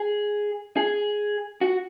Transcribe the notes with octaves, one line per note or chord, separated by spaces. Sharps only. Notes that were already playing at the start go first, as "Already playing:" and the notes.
Already playing: G#4
G#4
F#4